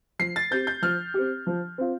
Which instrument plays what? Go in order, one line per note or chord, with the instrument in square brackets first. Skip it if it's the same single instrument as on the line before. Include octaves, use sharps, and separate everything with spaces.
[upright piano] F3 [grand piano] C7
[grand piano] A6
[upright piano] C4 G4 [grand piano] G6
[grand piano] G6
[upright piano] F3 [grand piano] F6
[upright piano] C4 G4
F3
C4 F4